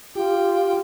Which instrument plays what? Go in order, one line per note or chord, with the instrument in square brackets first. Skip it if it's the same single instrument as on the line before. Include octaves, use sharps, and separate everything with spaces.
[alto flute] F4 [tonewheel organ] G4 [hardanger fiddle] G5